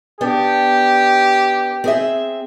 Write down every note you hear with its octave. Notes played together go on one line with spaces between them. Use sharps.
B3 D4 G4
C4 G#4 E5